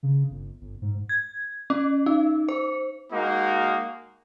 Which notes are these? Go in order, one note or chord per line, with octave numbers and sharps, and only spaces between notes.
C#3
G1
G1
G#2
G#6
C#4
D#4
C5
G#3 A#3 D#4 F#4